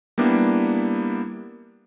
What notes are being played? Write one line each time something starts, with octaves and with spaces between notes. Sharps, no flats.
G3 A#3 B3 D4 E4